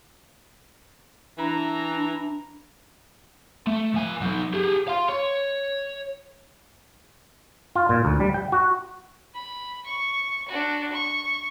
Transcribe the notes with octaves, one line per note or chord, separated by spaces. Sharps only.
E3 D4 A#5
A3
F3 G#5
F#3 D#4
G4 G#4
F5 C6
C#5
F4
A#2
D2
G3
G5
F#4
B5
C#6
D4 F#4
C#6